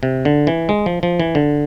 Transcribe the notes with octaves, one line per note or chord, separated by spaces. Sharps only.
C3
D3
E3
G#3
F3
F3
E3
D3